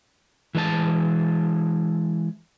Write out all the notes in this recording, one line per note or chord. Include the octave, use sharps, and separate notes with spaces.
E3 G#3 D4 A5